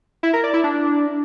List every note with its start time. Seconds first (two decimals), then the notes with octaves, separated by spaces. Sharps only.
0.23 E4
0.33 A#4
0.43 D5
0.54 E4
0.64 D4